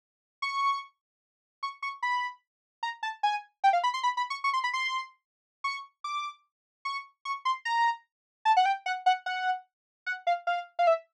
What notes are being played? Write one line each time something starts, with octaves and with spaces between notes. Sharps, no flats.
C#6
C#6
C#6
B5
A#5
A5
G#5
G5
F5
B5
C6
B5
B5
C#6
C#6
C6
B5
C6
C#6
D6
C#6
C#6
C6
A#5
A5
F#5
G5
F#5
F#5
F#5
F#5
F5
F5
F5
E5